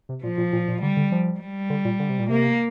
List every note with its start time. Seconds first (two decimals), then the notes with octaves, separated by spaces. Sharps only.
0.09 C3
0.23 A#2 F3
0.38 A#2
0.53 A#2
0.68 A#2
0.82 D3 G3
0.97 D3
1.12 F3
1.40 G3
1.70 D3
1.85 A#2
2.00 D3
2.10 C3
2.19 A#2
2.29 C3 A#3